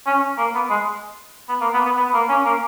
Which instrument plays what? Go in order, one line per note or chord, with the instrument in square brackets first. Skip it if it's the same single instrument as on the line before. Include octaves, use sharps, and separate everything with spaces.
[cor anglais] C#4
A#3
B3
G#3
B3
A#3
B3
B3
B3
A#3
C#4
A#3